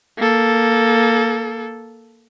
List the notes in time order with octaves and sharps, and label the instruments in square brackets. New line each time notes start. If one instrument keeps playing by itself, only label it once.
[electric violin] A#3 A4